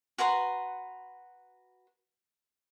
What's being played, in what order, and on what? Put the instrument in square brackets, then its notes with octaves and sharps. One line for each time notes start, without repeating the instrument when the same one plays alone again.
[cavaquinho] F#4 B4 A#5 C6